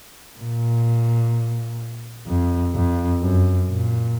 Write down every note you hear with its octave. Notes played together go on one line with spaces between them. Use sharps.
A#2
F2
F2
F#2
A#2